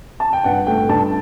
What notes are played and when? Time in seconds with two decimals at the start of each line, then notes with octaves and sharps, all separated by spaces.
0.20 A5
0.33 G5
0.44 G2 F#5
0.67 A3 G5
0.89 G2 A5